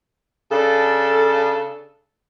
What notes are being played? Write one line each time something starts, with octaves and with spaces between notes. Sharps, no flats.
C#3 D4 A4